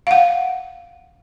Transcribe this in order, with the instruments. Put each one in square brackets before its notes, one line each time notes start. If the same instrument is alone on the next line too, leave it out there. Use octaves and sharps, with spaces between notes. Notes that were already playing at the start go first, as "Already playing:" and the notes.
[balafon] F5 F#5